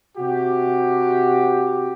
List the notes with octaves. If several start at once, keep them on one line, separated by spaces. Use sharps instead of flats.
C3 F#4 G4